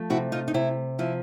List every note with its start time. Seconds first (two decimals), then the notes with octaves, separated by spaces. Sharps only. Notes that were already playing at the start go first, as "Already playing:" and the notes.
Already playing: F3 A3
0.10 C3 E4 F#4
0.32 D#4 F4
0.48 D#4
0.54 C3 E4
0.99 F3 E4